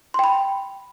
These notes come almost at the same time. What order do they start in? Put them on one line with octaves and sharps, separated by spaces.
C6 G5 B5